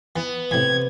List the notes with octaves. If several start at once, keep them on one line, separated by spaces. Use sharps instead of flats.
E3 B3
A2 C3 E3 G#6